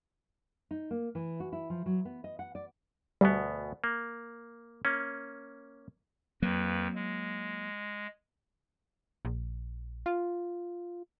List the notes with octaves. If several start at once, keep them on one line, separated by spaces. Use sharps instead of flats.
D#4
A#3
E3
F#4
E4
F3
F#3
B3
D#5
F#5
D5
D2 B2 G3 B3
A#3
A#3 C#4
F2 F#3 A#3 B4
G#3
A#1
F4